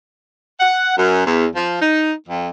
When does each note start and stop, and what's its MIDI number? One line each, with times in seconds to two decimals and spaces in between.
0.60 0.96 78
0.97 1.25 42
1.26 1.45 40
1.55 1.76 53
1.80 2.13 63
2.28 2.49 41